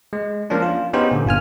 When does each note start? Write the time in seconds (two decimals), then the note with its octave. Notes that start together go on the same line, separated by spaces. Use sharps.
0.13 G#3
0.50 F3 A#3 C#4 D4
0.62 F4
0.93 B3 C#4 D#4 G4 G#4 C5
1.11 A#2 D3
1.26 G1 F4 G#5 F6